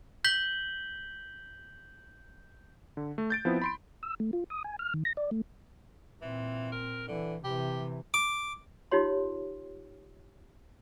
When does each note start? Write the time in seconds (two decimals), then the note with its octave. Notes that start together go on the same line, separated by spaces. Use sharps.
0.24 G6 B6 F#7 G7
2.97 D3
3.18 A3
3.30 G6 A6 D7
3.45 F3 B3 C4 E4
3.62 B5 C6 D7
4.03 E6
4.20 A3
4.33 F4
4.50 D#6
4.64 G#5
4.79 F6
4.94 D#3
5.05 A#6
5.17 D5
5.31 A3
6.22 A#2 E3 C4
6.72 A#4
7.08 D3 E3
7.44 C3 E3 G4
8.14 D6
8.91 D#4 F4 G4 C#5 C6